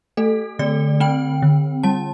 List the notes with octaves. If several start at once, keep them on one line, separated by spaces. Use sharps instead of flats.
A3 A4
D3 D5
C4 G5
D3
G3 A5